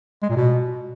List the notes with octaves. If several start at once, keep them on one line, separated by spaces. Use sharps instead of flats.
G#3
A#2
B2